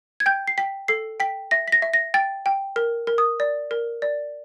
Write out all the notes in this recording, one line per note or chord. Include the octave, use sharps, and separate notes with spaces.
G#6
G5 G6
C7
G5 B6
A4 C7
G5 B6
E5 A#6
B6
A#6
E5
A#6
G5 A6
G5
A#4
A#4
D#6
D5
A#4
D5